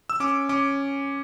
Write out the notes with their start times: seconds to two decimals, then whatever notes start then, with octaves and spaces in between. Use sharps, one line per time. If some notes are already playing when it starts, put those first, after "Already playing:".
0.10 E6
0.20 C#4 D6
0.49 C#4 D6